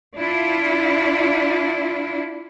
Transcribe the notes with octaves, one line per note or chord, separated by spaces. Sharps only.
D4 E4 F4